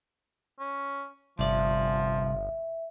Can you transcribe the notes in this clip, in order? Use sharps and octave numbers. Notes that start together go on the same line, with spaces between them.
C#4
G1 C2 F3 D5 E5